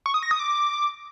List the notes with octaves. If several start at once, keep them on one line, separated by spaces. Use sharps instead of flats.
C#6
D#6
A#6
D#6
D6